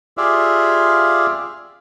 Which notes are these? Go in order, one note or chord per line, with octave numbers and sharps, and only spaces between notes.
F4 G4 G#4 D5 E5 F5